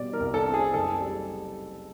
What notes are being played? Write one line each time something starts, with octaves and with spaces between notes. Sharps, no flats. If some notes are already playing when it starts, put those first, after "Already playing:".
Already playing: B2 G3 D5
A#4
C2
A4
C4
G#4
F#1 A4
G3